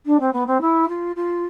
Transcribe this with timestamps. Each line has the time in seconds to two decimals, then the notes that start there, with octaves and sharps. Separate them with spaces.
0.06 D4
0.20 C4
0.33 B3
0.47 C4
0.61 E4
0.88 F4
1.16 F4